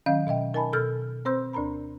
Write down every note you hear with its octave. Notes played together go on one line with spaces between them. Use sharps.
D#3 F#3 C#4 D#5 F5 G6
B2 D#5 E5 G5
D#4 A#4 D#5 G#5 A5 B5
B2 A4 E6 F6 A6
C4 B4 C5 C6 E6 G6
D2 D4 A#4 A#5 B5